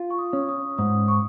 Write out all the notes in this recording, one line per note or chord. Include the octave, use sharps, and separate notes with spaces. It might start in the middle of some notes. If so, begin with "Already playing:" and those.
Already playing: F4
C#6
D#6
C#4
D#6
G#2 D#6
C#6